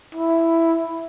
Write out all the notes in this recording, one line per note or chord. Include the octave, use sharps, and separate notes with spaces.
E4